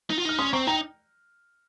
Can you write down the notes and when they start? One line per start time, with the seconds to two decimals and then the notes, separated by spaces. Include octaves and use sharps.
0.10 D#4
0.18 F4
0.25 D#4 F6
0.38 C#4 C6 D#6
0.53 C4 A#5 C#6
0.67 D#4 G5 A#5